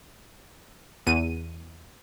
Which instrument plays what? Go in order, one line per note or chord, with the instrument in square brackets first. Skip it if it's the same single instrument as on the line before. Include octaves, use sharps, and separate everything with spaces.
[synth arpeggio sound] E2 D#7